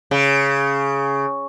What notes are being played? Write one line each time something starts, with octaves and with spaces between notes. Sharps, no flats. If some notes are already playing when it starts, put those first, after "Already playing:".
C#3